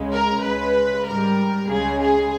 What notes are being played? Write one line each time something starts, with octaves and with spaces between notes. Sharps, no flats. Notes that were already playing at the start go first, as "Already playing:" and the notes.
Already playing: C#2 C#3 G#3
A#4
C#2 C#3 G#3 B4
G#2 G3 A#4
C#2 C#3 G#3 G#4
G#4